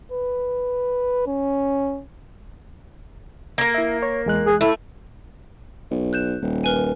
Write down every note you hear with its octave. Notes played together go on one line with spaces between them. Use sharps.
B4
C#4
A#3 A#4
E4 E5
C#5
E2 G#3 F#6
G#4
A3 E4
B1
F#6 G6 E7
D#1
A#4 B4 G#5